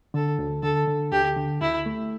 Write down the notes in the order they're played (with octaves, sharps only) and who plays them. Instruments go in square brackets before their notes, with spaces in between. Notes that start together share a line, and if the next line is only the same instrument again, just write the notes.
[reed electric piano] D3 [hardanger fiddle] A4
[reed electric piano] D2
[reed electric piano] D3 [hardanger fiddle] A4
[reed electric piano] D3
[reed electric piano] D2 [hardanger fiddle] G4
[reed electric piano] D3
[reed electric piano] D2 [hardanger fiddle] E4
[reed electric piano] A3